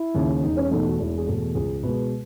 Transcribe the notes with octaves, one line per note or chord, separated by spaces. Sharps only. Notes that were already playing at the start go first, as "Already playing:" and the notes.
Already playing: E4
D#2 C#3
E1 D#4
C#4
E2 B2 A3 D#4
F#4
E1 E4
G#4
E2 B2 A3
G#4
C#2 G#4
B2 G#3 B4